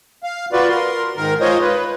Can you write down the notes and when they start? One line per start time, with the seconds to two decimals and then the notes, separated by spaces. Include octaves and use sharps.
0.23 F5
0.52 F4 F#4 B4 D5
0.69 A#4 C6
1.16 G#2 D#3 A#4
1.41 G#3 F4 C5 C#5 D#5
1.62 B4